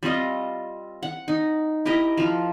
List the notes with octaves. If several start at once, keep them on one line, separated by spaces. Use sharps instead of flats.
G3 C4 F4 D#5
F#5
D#4
E4 G4 A#4 D#5
F3 F4